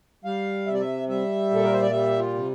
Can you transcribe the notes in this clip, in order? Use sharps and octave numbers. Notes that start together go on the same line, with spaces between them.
G3 F5
C3 E5
D5
E5
G3 E5
A#2 A4
A#4
C5
D5
G3 E5
F4
C3